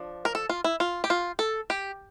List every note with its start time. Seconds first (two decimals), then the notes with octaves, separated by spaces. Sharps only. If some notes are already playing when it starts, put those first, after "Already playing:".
Already playing: F3 D4
0.25 A#4
0.35 A4
0.49 F4
0.64 E4
0.80 F4
1.04 G4
1.10 F4
1.39 A4
1.70 G4